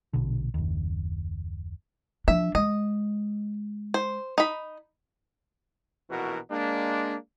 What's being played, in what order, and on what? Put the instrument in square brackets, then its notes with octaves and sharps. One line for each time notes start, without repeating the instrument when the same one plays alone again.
[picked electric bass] A#1 B2 D3
F#1 D#2
[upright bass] F3 D4 [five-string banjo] E5
[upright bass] G#3 [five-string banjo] D#5
[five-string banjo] C5
D#4 B5
[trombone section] A#1 B2 E3 E4 F#4 A#4
G#3 A#3 D4